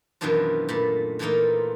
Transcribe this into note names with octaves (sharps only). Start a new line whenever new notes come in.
F#2 B2 D#3 E3 D4 F4
A#2 A3 B5
A#2 E3 A3 A#3 D#4 F4